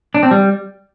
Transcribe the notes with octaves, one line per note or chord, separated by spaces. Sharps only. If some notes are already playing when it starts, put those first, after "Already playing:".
D4
C4
G3